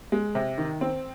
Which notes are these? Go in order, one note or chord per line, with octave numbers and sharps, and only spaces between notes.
G#3
C3
D#3
C4